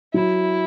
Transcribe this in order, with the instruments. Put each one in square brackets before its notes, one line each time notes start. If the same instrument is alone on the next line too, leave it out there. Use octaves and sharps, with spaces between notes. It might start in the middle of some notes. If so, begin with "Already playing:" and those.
[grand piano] F#3 [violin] E4